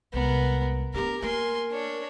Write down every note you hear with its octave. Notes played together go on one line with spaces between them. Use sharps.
C2 G#3 B3 A#4
B3 D4 G4 A#4
A#3 A#4 G#5 C6
D4 C#5